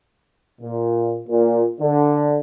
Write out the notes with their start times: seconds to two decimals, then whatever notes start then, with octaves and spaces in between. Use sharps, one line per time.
0.61 A#2
1.28 A#2
1.81 D3